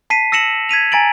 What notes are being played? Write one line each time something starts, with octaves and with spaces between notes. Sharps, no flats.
A5 B6 C7 D#7
E6 A#6 C#7 E7 F#7
G#6 B6 D#7 F7
G#5 A#5 A6 D7 F#7